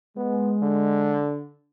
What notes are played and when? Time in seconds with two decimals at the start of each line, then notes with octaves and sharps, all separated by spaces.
0.17 G#3 B3
0.62 D3